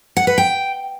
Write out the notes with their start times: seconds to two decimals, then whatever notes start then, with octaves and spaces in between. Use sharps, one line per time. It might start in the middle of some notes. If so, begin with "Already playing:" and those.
0.17 F#5
0.27 B4
0.38 G5